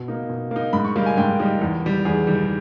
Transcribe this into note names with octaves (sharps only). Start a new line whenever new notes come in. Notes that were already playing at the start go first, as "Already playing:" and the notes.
Already playing: B2
A#3 D#4
B2
A#3 D#4
G#2 B5
C#6
G3 A#3 D#4
G#5
G#2 G5
G3 A#3 D#4
E2
D#3 G3
E2 G#4
D#3 G3